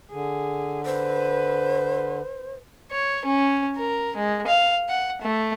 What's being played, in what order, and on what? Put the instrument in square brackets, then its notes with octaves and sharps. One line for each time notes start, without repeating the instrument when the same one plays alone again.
[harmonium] D3 [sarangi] G#4
[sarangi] B4 [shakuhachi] C5
[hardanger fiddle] C#5
C#4
A#4
G#3
F5
F#5
A3